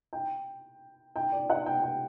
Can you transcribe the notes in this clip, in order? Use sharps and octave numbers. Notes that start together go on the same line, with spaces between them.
G5
G5
D5
F#5
G5
G5